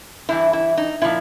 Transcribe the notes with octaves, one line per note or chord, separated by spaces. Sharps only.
G2 E3 E4
E4
D#4
A#2 F3 E4